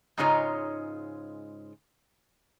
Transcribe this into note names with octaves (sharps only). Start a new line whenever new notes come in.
G#2 C#3 G#3 D#4 F4 C#5